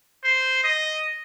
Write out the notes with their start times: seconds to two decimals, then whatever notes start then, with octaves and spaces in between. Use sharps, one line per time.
0.24 C5
0.64 D#5